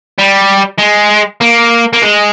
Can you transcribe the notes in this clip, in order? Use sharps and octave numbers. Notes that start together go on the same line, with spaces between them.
G3
G#3
A#3
A#3
G#3